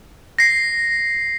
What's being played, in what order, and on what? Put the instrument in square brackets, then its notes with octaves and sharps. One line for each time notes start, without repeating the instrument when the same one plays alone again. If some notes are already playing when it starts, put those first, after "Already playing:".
[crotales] A#6 C7